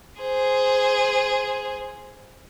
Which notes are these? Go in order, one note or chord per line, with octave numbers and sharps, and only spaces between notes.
G#4 C5